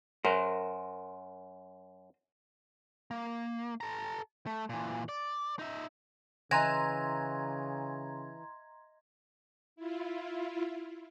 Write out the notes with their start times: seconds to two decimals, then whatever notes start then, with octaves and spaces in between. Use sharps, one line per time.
0.25 F#2 A#4 C5
3.11 A#3
3.81 A4 A#5
4.46 A3
4.70 A#2 E3
5.09 D5
5.59 D#4 E5
6.51 C#3 E3 D#5 A#5 C6 G#6 A#6
9.76 E4 F4